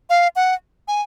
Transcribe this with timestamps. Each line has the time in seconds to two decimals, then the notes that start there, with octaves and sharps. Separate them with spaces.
0.10 F5
0.36 F#5
0.88 G#5